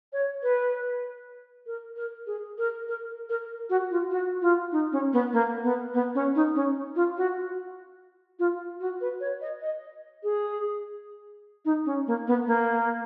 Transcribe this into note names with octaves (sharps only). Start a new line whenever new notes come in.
C#5
B4
A#4
A#4
G#4
A#4
A#4
A#4
F#4
F4
F#4
F4
D#4
C#4
B3
A#3
B3
B3
C#4
D#4
C#4
F4
F#4
F4
F#4
B4
C#5
D#5
D#5
G#4
D#4
C#4
A#3
B3
A#3